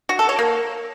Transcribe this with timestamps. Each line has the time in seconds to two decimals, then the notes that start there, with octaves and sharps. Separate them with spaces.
0.09 F#4
0.19 A4
0.29 C#5
0.39 A#3